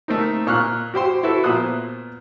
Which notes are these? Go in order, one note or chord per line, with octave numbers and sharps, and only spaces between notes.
A3 A#3 C4 D#4
A#2 C#6 F6 F#6
F#4 G4 C5 C6
E4 F#4 A4 B4
A#2 F3 B3 C5 D#6 F#6